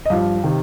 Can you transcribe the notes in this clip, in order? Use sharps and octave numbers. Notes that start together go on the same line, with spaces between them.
D#5
G2 F3 F5
C3 D#3